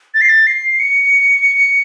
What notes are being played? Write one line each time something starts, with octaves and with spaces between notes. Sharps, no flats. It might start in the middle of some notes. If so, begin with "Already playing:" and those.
A6
C7
A6
C7
C#7